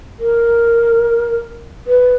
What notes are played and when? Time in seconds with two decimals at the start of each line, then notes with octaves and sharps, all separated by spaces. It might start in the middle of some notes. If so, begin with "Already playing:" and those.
0.20 A#4
1.87 B4